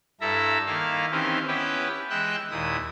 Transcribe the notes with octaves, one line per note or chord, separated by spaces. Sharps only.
G2 E4 A4 E5 A#5
D#3 A#3 E4 F5
D#3 E3 C4 C#4 G4 C5
B3 C#4 E4 G4 B4 G5
E3 G#3 G5 E6 F#6
D#2 A#2 E4 D#6